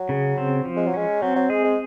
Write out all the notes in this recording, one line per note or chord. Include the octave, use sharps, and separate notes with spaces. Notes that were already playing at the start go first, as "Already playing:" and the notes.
Already playing: F#3
C#3
C4
F3
G#3
F#3
G#3 C#4
F#3 C4
F#3
G#3 G#4
G#3